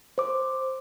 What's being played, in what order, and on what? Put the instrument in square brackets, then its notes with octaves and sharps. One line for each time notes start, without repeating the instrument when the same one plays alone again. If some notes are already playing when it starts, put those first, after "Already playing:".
[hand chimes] C5 D6